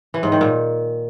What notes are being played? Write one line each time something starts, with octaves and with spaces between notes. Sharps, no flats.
E3
G#2
D#3
A#2